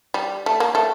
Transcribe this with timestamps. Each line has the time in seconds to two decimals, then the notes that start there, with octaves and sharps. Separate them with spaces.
0.14 G3
0.46 A3
0.60 A#3
0.75 A3